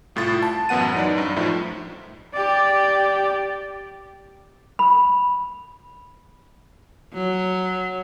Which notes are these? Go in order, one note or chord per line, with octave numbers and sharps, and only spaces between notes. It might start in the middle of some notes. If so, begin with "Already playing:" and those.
C2 A2 F4 A6
A5
A1 F#2 B3 F#5 D#7
F#2 D#4 D5
G2
F#2 A2 F3 D#4 E4
G4 D5
B5
F#3